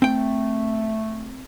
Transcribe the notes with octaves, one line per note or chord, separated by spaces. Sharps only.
A3 C4 G5